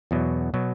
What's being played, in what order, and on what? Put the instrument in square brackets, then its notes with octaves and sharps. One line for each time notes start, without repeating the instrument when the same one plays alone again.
[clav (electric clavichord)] E2 B2 F#3
B2 F#3